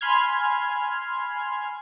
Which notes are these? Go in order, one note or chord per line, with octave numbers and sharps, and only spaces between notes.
G#5 B5 C6 F6 G#6